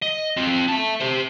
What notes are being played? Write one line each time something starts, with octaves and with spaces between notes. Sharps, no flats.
D#5
C4 F4
E5 A5
G4 C5